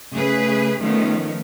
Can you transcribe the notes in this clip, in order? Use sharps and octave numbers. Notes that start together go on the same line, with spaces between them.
C#3 A3 G#4 B4
D#3 F3 A3 B3 C#4